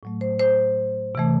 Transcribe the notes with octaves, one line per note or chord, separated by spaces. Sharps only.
A2 F#3 A3
C5
C5
C3 E3 A3